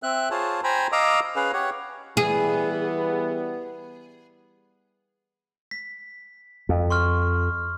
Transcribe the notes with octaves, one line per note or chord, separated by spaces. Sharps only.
C4 E5 F#6
F4 G#4 C5 C#5 A5
C5 G5 G#5 A#5 B5
D#5 F5 A#5 D6 E6
C#4 G#4 B4 F5
G4 C#5 F#5
E3 G3 B3 G#4
B6
F2
C6 C#6 F6